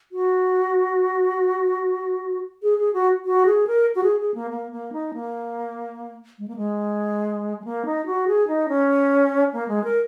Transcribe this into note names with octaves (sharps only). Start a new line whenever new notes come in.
F#4
G#4
G#4
F#4
F#4
G#4
A#4
F#4
G#4
G#4
A#3
A#3
A#3
D#4
A#3
G#3
A#3
G#3
G#3
A#3
D#4
F#4
G#4
D#4
C#4
A#3
G#3
A#4